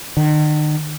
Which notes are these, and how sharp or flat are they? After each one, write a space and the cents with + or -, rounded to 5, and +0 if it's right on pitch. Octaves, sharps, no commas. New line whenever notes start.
D#3 -45